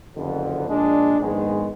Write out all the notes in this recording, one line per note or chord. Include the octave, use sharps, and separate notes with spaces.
F#1 F2 D3
A#1 A#2 G#3 D4
A#1 G#2 D#3 G#3 B3